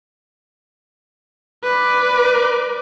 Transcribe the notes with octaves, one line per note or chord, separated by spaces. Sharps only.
B4 D5